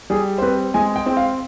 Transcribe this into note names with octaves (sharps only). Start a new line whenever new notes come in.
G3 G#4
C5
C4 B4
G#3 G#5
G5
C4
F5